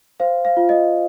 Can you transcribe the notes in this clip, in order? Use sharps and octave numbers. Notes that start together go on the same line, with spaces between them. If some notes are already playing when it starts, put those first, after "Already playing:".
C5 F5
F5
F4
D#5